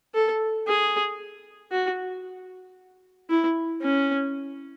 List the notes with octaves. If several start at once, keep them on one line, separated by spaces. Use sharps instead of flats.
A4
G#4
F#4
E4
C#4